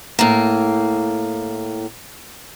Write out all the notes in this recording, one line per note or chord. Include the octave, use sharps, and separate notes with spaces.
A2 A#3